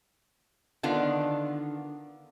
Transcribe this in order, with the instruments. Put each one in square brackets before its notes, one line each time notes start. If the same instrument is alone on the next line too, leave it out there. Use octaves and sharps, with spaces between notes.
[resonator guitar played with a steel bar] D3 D#3 B3 D4 F4 D5